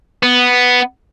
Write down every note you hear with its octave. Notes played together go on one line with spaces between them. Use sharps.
B3